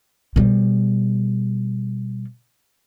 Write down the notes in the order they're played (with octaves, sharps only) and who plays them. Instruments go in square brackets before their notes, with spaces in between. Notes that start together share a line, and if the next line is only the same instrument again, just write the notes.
[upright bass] B2 G3